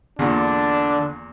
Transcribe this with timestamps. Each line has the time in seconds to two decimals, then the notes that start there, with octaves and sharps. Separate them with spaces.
0.19 E2 A#2 D3 D4